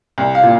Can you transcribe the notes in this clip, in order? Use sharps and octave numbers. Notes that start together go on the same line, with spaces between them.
C2
F5
A#2